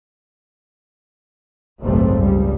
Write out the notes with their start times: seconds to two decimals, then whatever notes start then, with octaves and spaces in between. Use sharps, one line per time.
1.82 F#1 B1 G#2 G3 A3 C4
2.16 C#2 G3